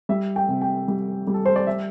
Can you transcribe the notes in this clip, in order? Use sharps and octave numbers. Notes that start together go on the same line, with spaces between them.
G3 E5
G5
C3
G5
G3
G3
A4
C5
D5
E5